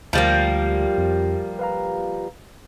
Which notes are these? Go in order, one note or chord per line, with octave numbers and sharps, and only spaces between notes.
D2 F3 G3 A#3
F2
B4 F5 A#5